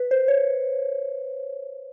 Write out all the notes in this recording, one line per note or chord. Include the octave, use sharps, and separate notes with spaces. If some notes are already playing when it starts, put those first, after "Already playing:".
Already playing: B4
C5
C#5